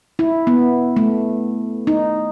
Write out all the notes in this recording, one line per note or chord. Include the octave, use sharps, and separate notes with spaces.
E4
B3
A3
D#4